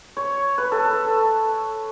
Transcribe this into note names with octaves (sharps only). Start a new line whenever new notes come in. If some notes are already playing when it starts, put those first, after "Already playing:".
C#5
B4
A4
B4